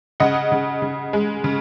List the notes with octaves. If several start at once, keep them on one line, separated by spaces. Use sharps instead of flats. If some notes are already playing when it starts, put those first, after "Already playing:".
C#3 D#5 F#5
C#3
C#3
G#3
C#3